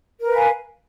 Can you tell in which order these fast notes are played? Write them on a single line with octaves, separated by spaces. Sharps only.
A#4 B4 F5 G#5